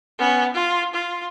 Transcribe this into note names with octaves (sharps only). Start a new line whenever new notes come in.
B3 C#4
F4
F4